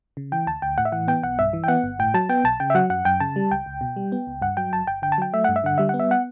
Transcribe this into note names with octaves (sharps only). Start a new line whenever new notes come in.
C#3
E3 G5
D2 A5
D2 G5
A2 F#5
E5
E3 F#5
B3 G5
B1 F#5
G2 E5
E3
G5
B3 F#5
G1
A2 G5
F#3 A5
B3 G5
B1 A5
C#3 G5
E5
F#3 F#5
F#2 F#5
F#2 G5
C#3 A5
G3
C#2 G5
C#2
B2
G3
B3
C#2
G2 F#5
F#3 G5
G1 A5
G1 G5
D3 G5
A5
F#3 G5
A3 E5
G2 F#5
E5
D3 F#5
G3 E5
B3 F#5
E5
F#5